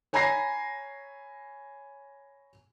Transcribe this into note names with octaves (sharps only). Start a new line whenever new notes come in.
C#5 G#5 A#5 B5 A#6 C7